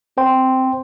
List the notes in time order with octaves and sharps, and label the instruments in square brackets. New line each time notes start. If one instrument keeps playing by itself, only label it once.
[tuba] C4 [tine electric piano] C5 G5 C6